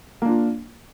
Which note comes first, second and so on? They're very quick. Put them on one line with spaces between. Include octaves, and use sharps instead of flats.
A#3 D4 F4